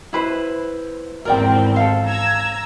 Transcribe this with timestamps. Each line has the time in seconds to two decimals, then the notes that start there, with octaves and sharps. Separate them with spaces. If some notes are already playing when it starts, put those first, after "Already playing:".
0.13 E4 B4 C5
1.25 G#1 E2 C4 A#4 D5 G5
1.76 A4 F5
2.07 A#5 E6 G#6